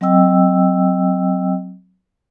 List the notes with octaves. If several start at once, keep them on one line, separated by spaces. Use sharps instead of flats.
F#3 C4 D#5 G5 E6